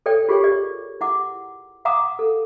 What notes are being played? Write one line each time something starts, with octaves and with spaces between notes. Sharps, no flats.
A4 C#5 D5 G5
F4 G4 G#4 A#4 C#5 G5
G4 D5
E4 F#5 D6
F5 F#5 A#5 D6 D#6
A4